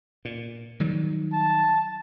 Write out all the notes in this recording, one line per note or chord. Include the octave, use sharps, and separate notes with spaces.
A#2
D#3 F#3 G3
A5